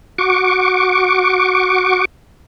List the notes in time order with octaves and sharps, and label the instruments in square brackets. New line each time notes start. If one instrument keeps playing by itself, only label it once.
[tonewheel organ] F#4 C#6 D6